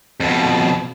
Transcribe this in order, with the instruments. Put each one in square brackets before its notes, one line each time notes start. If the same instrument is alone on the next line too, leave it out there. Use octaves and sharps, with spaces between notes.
[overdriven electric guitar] F2 B2